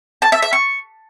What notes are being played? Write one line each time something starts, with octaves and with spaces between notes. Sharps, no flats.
A5
E5
E5
C#6